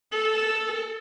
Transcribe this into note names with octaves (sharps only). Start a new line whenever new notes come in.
A4